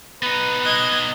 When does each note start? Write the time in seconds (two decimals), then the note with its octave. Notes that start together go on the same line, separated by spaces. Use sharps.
0.23 B3 D#4 B4
0.63 D#5 F#6 G#6